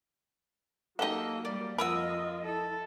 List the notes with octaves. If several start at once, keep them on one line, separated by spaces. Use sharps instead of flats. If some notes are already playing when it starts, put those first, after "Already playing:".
F#3 A#3 D#4 G4 A4 D#5 F#5
G3 D5
F2 F4 A#4 D#5 F#5 B5 D#6 E6
E4 A4